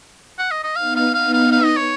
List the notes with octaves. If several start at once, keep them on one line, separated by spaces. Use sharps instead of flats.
F#5
D#5
D#5
B3 D#4 F5
F5
B3 D#4 F5
F5
F5
D#5
C#5